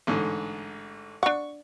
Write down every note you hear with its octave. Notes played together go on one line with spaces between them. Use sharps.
A1 G#2 D3
D4 F#5 C#6